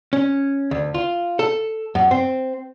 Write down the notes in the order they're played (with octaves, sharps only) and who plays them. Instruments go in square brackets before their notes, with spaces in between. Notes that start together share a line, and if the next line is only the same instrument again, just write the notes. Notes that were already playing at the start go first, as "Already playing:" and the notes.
[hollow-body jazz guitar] C#4
D2
F4
A4
F#2
C4